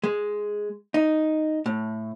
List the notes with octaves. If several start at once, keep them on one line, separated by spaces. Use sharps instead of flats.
G#3
D#4
A2